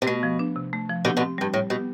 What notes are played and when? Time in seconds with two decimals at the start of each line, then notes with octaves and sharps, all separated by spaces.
0.02 C3
0.07 B2 A3
0.23 F3
0.39 D4
0.56 C3
0.73 A3
0.89 F3
1.05 B2 D3 G4
1.17 B2 D3
1.21 C4
1.38 G2 G3
1.54 A2 G3
1.70 B2 G4